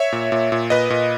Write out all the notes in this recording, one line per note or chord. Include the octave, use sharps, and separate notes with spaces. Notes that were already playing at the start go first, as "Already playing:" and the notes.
Already playing: C#5 E5
A#2
A#2
A#2
A#2 B4 D#5
A#2